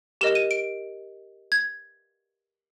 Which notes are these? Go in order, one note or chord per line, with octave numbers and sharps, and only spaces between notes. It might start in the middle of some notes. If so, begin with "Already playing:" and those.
G4 A#4 D#5 E7
D#7
D7
G#6